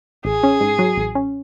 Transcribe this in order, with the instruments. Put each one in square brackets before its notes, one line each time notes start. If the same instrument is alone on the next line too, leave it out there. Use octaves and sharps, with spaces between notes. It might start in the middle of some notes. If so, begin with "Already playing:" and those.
[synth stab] A1 [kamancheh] G#4
[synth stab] C#4
G#2
F#3
A1
C#4